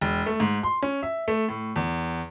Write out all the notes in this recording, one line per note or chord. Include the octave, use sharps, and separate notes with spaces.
E1
A3
G#2
C6
C#4
E5
A3
A2
E2